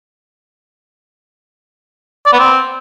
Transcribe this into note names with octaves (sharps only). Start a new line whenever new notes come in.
D5
B3
C4